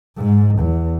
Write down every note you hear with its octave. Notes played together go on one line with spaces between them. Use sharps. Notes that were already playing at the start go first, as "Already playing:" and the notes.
G#2
E2